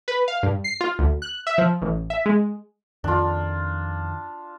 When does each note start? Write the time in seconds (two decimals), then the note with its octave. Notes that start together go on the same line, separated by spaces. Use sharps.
0.08 B4
0.28 F5
0.43 G2
0.64 C7
0.81 F4
0.99 D2
1.22 F#6
1.47 E5
1.58 F3
1.82 A1
2.10 E5
2.26 G#3
3.04 F2 D#3 D4 F4